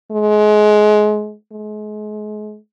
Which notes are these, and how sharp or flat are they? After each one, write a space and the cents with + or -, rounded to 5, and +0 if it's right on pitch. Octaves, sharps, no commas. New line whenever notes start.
G#3 +25
G#3 +35